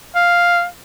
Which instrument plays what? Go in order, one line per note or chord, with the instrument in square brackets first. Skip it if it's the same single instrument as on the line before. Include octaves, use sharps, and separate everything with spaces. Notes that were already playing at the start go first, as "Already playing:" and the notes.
[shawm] F5